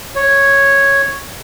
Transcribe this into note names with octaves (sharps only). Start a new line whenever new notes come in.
C#5